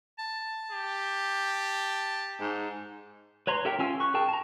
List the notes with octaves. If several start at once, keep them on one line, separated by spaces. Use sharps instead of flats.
A5
G4
G#2
B4 C#5 A#5 C6
G4 A4 A#4 E5 G5
C#4 F4 G#5 E6
C#6 F#6
G#4 A#4 G5 A5
A5 A#5